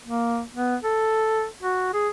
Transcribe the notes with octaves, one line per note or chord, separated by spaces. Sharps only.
A#3
B3
A4
F#4
G#4